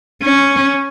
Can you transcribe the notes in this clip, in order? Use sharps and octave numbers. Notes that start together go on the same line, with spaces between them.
C#4